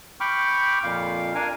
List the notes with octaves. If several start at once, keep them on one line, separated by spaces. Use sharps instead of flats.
G5 B5 C#6 D6 F6
F2 A#2 F5
D4 A#4 F5 G#5